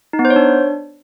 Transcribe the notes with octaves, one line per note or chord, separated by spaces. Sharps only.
D#4
B3
C5
C#5
D4